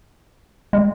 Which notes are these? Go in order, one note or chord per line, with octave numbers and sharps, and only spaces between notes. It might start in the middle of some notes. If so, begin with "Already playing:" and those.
G#3